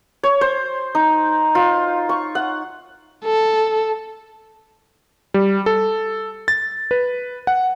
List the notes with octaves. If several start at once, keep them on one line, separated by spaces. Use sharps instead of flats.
C#5
C5
D#4
F4
C#6
F#5
A4
G3
A4
A6
B4
F#5